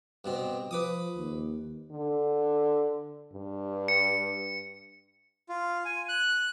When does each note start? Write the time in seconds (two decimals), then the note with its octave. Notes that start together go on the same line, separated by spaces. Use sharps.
0.24 G2 B2 C4
0.71 F3 B4 D6 D#6
1.17 D#2
1.91 D3
3.33 G2
3.88 C#7
5.49 F4
5.85 G#5
6.09 F#6